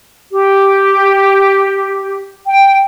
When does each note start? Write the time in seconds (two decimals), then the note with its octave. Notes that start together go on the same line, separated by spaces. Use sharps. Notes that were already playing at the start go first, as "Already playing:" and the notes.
0.32 G4
2.47 G5